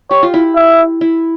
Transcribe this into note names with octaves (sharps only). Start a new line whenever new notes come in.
G4 C#5
F4
E4
E5
E4